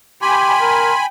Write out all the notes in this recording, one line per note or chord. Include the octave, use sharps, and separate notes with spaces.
G4 G5 G#5 B5 C6
A#4